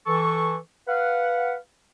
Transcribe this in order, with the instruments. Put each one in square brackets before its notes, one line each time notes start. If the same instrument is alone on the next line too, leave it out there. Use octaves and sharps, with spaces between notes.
[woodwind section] E3 A4 C#6
B4 F5 F#5